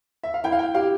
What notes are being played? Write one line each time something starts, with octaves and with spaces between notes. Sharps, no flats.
E5
F5
E4 G5
F5
G5
G4 F5